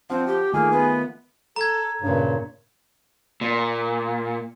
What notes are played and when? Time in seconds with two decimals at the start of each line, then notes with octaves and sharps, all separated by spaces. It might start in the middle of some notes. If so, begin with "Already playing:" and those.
0.10 F3 C4 D4 F#5
0.27 G4
0.54 D#3 A3 A#3 F4 G#4
0.72 B3 B4
1.56 A4 A#5 G#6
2.02 G2 A#2 C#3 B4
3.41 A#2